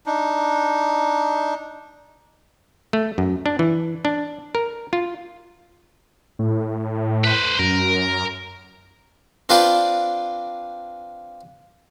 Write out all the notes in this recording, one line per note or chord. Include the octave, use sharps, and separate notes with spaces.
D4 D#4
A3
F#2
D4
E3
D4
A#4
F4
A2
B4 C5
F#2 A#4
C4 D4 F4 B4 C5 D5